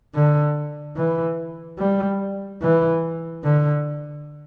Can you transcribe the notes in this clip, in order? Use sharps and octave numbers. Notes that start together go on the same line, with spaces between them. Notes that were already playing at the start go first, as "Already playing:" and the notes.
D3
E3
G3
E3
D3